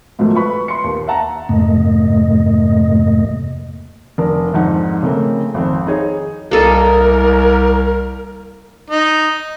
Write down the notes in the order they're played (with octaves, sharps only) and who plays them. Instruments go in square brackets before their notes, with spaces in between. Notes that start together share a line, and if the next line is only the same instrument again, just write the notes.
[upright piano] G#2 D#3 F3 F#3 A3
B4 B5 C#6
C6 C#7
D#2
E5 F#5 A5 A#5
[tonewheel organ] F2 G#2 C3 A3 A#3 D#5
[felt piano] F1 D4 A#4
F2 G#2 D#4 F#5
C#3 A3 A#3 C4
G#1 F2 C4
D#4 G#4 C#5
[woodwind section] C2 [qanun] A#3 A4 D#5 [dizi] A#4
[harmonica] D#4